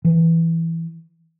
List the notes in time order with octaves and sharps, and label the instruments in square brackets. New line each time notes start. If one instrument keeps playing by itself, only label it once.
[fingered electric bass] E3